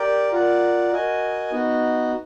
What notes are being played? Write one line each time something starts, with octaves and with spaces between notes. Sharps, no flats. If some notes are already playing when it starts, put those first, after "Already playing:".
Already playing: G4 A#4 D5 G5
F4 A#4 D5 F#5
F#4 A#4 D#5 G#5
B3 D#4 F#4